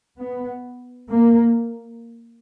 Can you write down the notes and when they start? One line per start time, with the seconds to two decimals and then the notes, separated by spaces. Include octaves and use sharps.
0.19 B3
1.10 A#3